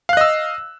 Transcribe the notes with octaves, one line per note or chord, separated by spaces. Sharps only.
D#5 F5 E6 F#6